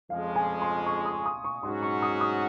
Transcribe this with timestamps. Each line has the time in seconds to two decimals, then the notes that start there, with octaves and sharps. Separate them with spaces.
0.10 F2 C#3 F3 G#3 F5
0.36 G#5
0.62 C6
0.86 C#6
1.05 D#6
1.26 D#6
1.44 C#6
1.63 G#2 F#3 C#4 F#4 C6
1.83 C#6
2.02 D#6
2.21 D#6